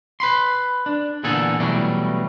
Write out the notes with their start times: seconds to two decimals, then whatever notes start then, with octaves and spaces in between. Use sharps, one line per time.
0.20 B4 B5 C6
0.86 D4
1.24 E2 A#2 D3 G#4 A4 G#5
1.60 B2 E3 F#3 G3 A3